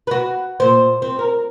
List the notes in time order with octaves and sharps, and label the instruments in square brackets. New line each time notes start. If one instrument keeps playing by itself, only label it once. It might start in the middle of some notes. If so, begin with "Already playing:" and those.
[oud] F#4 B4
A#2 C5
C4
A#4